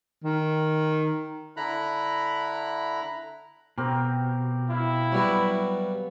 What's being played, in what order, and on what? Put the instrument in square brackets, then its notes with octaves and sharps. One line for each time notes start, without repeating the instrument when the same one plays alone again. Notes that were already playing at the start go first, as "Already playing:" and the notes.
[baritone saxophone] D#3
[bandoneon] D3 E4 A#5 B5 F#6
[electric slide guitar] B2 [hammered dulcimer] C4 G4 A#4
[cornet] E4 [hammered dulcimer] F5
[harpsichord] F#3 G3 F#4 [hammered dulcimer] B3